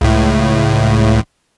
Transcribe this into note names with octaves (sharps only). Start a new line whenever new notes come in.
C#2 A2